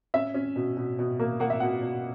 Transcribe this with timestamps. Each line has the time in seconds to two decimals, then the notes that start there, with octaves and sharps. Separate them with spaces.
0.14 C#4 E5
0.34 C#4
0.56 B2
0.77 B2
0.99 B2
1.20 A#3
1.40 A#3 F#5
1.50 E5
1.60 B2 F#5
1.82 B2